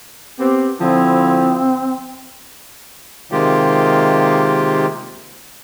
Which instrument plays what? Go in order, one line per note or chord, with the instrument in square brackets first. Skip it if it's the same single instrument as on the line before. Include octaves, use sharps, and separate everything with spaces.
[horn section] B3 C4 G4
[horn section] D3 F3 E4 [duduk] C4
[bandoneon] C3 D#3 G#3 A#3 F4 G4